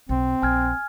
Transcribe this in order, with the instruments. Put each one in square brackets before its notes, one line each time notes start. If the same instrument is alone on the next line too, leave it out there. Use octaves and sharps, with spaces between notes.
[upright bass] B1 [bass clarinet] C4
[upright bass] A#1 [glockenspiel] G#5 F6 G#6